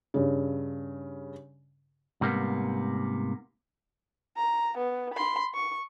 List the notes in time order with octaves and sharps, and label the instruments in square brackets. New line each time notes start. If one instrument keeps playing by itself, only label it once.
[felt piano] G2 C#3
[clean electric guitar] G#2 C3 G3 A#3 B3
[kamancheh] A#5
B3
B5 C6
C#6